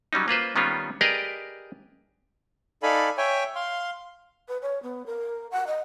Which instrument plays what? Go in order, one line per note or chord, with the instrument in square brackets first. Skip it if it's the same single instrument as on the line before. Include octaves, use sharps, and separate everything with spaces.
[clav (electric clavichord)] F#3 G3 C#4 D#4
A#3 F4 B4 C5
D#3 G3 B3 C#4 F4
G4 G#4 A#4 B4 D5 D#5
[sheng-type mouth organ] D#4 A4 D5 F5 G#5 B5
C#5 E5 G5 G#5
F5 C6
[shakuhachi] B4
C#5
B3
A#4
F#5
D#5